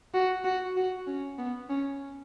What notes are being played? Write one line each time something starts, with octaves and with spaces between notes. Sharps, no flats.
F#4
F#4
F#4
C#4
B3
C#4